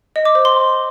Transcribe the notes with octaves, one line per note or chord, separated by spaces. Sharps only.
D#5
D6
C5
C6